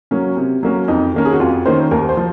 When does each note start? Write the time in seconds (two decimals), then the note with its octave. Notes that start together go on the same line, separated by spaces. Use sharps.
0.11 F#3 A#3 C#4
0.37 C3
0.63 F#3 A#3 C#4
0.88 F2 D#4
1.14 D#3 A#3 C#4 A#4
1.25 G#4
1.32 F#4
1.40 F2 F4
1.66 D#3 A#3 C#4 C5
1.91 D#2 A#4
2.09 C5
2.17 F3